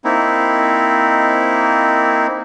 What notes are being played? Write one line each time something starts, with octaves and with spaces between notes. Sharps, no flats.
A#3 C4 D#4 E4